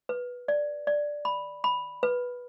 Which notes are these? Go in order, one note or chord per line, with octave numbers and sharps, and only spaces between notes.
B4
D5
D5
B5
B5
B4